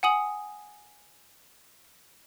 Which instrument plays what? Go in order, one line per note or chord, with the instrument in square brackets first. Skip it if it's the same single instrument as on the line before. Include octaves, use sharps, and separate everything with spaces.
[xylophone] F#5 G#5 D#6 F#7